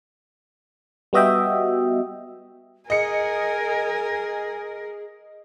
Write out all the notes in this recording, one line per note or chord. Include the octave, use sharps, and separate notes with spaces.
G3 B3 F#4 D#5 E5 G5
G#4 A#4 D#5 G#5 C#7